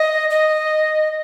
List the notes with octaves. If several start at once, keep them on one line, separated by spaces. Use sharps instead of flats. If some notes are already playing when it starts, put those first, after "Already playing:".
Already playing: D#5
D#5